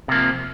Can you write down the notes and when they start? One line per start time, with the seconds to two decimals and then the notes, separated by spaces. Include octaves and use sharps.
0.08 C3
0.12 A#3
0.15 F3